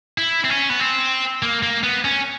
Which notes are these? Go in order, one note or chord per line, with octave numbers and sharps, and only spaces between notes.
E4
C4
C#4
B3
C4
A#3
A#3
B3
C#4